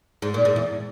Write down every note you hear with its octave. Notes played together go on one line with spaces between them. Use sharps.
G#2
A#2
G#2
E2